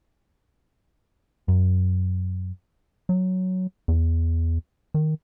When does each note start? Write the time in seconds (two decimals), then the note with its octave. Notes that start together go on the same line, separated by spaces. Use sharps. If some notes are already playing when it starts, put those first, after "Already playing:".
1.48 F#2
3.09 F#3
3.88 E2
4.94 D#3